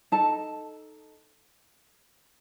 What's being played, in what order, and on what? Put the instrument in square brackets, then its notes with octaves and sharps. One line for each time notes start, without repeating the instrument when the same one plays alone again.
[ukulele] D#4 A4 A5